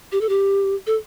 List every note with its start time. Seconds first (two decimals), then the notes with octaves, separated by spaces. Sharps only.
0.12 G4
0.21 A4
0.29 G4
0.87 A4